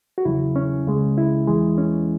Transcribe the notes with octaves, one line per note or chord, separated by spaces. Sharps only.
F#4
E2 C#3 F#3 E4
C#4
C#2 C#3 G#3
E4
E2 E3 G#3
C#4